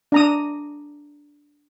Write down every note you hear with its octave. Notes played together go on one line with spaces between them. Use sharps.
D4 A#5 D#6